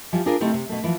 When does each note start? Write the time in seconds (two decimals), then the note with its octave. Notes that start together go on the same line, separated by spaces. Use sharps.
0.12 E3 F3 G3
0.26 D4 F4 G#4 A#4
0.40 C3 A3 C4 D#4 E4 G4
0.54 C3
0.69 B2 A3
0.84 E3 F3